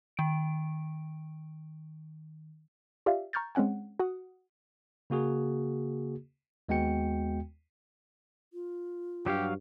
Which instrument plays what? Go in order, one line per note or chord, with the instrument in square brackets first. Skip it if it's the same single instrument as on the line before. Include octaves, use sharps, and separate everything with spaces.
[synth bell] D#3 D7
[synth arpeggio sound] F4 G4 D5 E5 F5
A#5 C#6 F6 G6 A6
G#3 C4 C#4 F#5 G#5
F#4 F#5 D#6
[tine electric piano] C#3 A#3 F#4 G#4
D#2 G#3 B3 F#4 G5 C#7
[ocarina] F4
[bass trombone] G2 [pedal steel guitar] F#3 C#5 F5 [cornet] G4